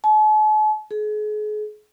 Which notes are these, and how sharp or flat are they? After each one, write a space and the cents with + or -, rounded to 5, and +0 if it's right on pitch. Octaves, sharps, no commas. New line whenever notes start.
A5 -45
G#4 +35